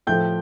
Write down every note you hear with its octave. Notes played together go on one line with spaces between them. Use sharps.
A2 F3 A3 G5 G6